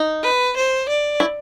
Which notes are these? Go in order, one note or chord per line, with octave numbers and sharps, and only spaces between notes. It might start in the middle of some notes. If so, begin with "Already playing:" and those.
Already playing: D#4
B4
C5
D5
E4